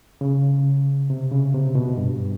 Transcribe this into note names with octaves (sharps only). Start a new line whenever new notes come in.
C#3
C3
C#3
C3
B2
G2